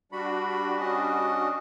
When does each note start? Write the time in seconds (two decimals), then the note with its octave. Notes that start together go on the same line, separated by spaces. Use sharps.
0.12 G3 D4 F#4 B5
0.80 C#4 D#5